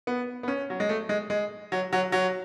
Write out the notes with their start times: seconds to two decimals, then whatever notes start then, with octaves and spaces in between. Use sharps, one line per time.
0.07 B3
0.43 B3
0.48 C#4
0.70 F#3
0.80 G#3
0.89 A3
1.09 G#3
1.30 G#3
1.72 F#3
1.93 F#3
2.12 F#3